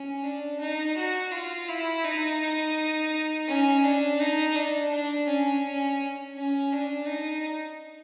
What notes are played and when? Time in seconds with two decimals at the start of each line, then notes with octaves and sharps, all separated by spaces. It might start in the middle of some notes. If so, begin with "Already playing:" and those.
Already playing: C#4
0.24 D4
0.60 D#4
0.97 F#4
1.31 F4
1.69 E4
2.04 D#4
3.48 C#4
3.84 D4
4.20 D#4
4.55 D4
4.91 D4
5.27 C#4
5.64 C#4
6.36 C#4
6.72 D4
7.07 D#4